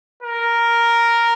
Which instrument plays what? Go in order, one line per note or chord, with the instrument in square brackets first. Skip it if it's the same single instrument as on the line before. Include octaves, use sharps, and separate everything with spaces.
[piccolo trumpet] A#4